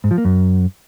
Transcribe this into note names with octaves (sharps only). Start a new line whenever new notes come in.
G#2
F3
A#3
F#2